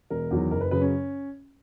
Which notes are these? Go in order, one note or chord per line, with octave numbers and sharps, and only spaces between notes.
E1 A#4
E2 D#3 F#3
F#1 A#4
B4
F#2 C#3 B4
C#4